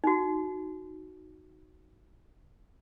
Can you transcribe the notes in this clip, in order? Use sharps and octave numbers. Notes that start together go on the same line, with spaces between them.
D#4 F#4